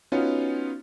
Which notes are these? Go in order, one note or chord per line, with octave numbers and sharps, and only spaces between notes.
B3 C#4 D#4 F4 F#4 C#5